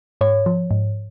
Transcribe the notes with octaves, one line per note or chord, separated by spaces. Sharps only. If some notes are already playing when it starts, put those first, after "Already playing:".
G#2 C#5
F3
G#2